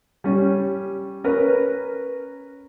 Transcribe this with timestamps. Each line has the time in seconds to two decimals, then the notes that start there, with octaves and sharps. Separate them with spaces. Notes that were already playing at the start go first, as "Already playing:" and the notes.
0.24 G3 C#4
1.24 C#4 A#4 B4